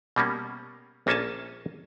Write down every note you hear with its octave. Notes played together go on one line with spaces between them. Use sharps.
B2 G3 A#3 C#4
A#1 A#3 C#4 A4 G#5 A5